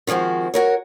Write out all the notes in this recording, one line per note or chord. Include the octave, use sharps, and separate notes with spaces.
D#3 F3 G#3 C4 F#4
F#4 A#4 C#5